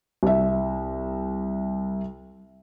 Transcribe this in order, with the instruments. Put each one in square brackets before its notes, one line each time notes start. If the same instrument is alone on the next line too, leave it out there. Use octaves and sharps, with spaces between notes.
[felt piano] C2 E5